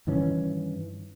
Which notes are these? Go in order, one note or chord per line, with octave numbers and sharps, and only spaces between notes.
G2 D#3 E3 C#4